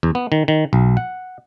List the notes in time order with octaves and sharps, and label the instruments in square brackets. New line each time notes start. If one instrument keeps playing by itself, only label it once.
[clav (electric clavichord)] E2
B3
D#3
D#3
B1
F#5